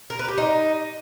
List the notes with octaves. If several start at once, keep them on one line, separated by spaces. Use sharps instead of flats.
A#4
B4
G4
D#4